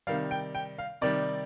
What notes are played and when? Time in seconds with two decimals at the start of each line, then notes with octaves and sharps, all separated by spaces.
0.07 C3 D#3 G3 F5
0.31 G5
0.55 G5
0.78 F5
1.01 C3 D#3 G3 D5